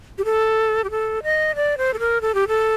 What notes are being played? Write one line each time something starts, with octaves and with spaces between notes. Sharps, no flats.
G4
A4
G4
A4
D#5
D5
C5
A4
A#4
A4
G4
A4